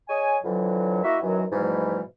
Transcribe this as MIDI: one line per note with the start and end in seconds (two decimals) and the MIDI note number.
0.08 0.36 68
0.08 0.36 73
0.08 0.36 75
0.08 0.36 80
0.43 1.02 41
0.43 1.02 50
0.43 1.02 52
0.43 1.02 54
1.03 1.16 58
1.03 1.16 64
1.03 1.16 66
1.03 1.16 75
1.03 1.16 76
1.21 1.44 42
1.21 1.44 51
1.21 1.44 52
1.21 1.44 54
1.51 2.00 44
1.51 2.00 47
1.51 2.00 52
1.51 2.00 53
1.51 2.00 55
1.51 2.00 57